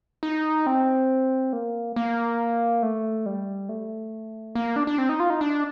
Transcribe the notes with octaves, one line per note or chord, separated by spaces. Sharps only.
D#4
C4
A#3
A#3
A3
G3
A3
A#3
D4
D4
C4
D#4
F4
D#4
D4